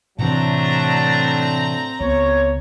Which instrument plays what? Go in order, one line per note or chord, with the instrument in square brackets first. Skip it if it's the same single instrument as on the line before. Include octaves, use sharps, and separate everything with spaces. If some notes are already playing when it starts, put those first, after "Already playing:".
[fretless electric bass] A2 C3 E3 [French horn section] F#3 A3 D4 [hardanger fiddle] C4 A#5
[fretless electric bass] C#2 B3 [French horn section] C#5